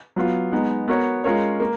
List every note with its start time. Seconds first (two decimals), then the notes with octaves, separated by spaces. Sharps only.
0.16 F#3 B3 F4
0.51 G#3 B3 D#4
0.88 B3 F#4 A#4 C#5
1.24 G#3 C#4 F4 A#4 C#5
1.60 A#3